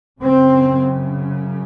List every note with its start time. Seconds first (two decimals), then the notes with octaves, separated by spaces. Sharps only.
0.21 F#2 C#3 C4